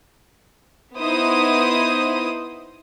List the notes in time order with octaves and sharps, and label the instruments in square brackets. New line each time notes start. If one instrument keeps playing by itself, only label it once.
[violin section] B3 D#4 E4 C5 D#6